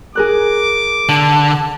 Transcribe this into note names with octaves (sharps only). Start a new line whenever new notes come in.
G#4 A#4 D6 F#6
D3 A5